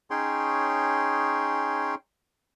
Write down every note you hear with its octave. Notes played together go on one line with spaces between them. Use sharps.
C#4 D#4 G#4 C#5 G5 C6